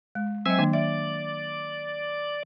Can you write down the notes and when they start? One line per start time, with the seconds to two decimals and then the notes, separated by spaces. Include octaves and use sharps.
0.15 G#3
0.46 F#3 C4 D#5 E5 G#5
0.59 D#3 A#3 D4
0.73 D5 E5